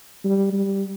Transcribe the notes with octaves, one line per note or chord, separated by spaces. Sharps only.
G3
G3